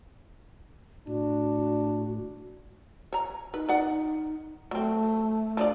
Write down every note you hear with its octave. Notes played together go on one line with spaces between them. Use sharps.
A2 D4 F#4
C#5 A#5
D#4 B4
D5 F#5
F#3 A3 C4
F3 D4 D5